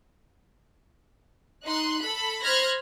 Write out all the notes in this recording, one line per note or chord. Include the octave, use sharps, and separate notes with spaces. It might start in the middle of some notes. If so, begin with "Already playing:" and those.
D#4 C6 F#6
A4 B5
C5 B5 F6 F#6 G#6 A#6